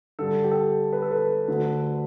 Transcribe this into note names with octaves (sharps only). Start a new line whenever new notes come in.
G2 D3 A4
G4
A4
B4
A4
B4
D2 D3